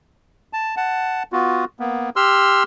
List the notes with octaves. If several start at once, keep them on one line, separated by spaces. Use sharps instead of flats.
A5
F#5 A5
B3 F4 F#4
A#3 B3
G4 C6 E6 F6